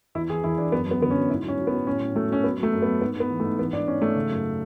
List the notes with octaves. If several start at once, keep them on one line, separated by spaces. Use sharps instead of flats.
E2 E4
E3 G#4
E2 E4
E2 D4
F#2 B3
F#2 B3
D3 B3
C#4
F#2
G#2 E4
F#3 C#4
F#3
B3
F#3
A2 C#4
A2
F#3 A3
F#3 C#4
F#3 B3
F#3 A3
F#2
B3
F#2
G#2 B3
G#2 B3
E3
A3
G#2
E3 B3
G#2 D4
G#2 C#4
G#2 A3
C#3
F#2